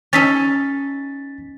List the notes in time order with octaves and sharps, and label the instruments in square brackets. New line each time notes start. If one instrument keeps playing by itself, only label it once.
[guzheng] C#4 D#4 A4 [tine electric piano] A6 B6